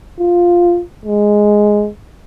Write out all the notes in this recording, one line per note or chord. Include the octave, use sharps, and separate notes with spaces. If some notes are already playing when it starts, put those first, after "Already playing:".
F4
G#3